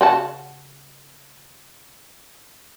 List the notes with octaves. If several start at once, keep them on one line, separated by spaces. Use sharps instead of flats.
C#3 F#4 A5